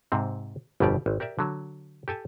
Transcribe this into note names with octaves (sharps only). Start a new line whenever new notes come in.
G#2 C3 C4
G1 F2 B2 G3 G4 D5
G#1
G4 A#4 D5 E5
D3 F#3
G4 A4 G#5 A5